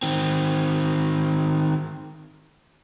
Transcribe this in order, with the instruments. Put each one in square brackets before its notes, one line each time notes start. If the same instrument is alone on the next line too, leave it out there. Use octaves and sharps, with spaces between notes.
[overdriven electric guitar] D#3 C4